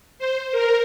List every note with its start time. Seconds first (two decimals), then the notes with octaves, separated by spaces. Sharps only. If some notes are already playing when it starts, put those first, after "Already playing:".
0.18 C5
0.52 A#4